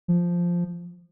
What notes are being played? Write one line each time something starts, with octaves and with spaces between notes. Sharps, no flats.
F3